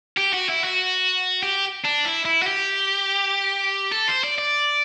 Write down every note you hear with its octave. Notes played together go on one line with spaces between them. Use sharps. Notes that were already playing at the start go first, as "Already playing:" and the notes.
G4
F#4
E4
F#4
G4
D4
E4
E4
F#4
G4
A4
C5
D5
D5